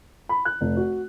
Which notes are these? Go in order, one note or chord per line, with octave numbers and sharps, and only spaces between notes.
B5
F#6
F1
F#4